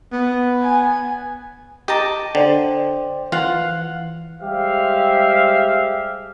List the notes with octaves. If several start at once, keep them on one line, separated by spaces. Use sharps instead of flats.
B3
G#5
G4 D#5 A5 A#5 D6
D3 C5 D5 G5
E3 F4 F5 F#5
G3 G#3 G4 C5 E5 F5